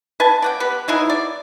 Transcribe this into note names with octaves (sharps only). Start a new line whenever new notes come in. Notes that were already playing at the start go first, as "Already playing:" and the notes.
B4 G#5 A5
D5 F#5 G5
B3 G4 B4
F#3 D#4 E4 G#4
D5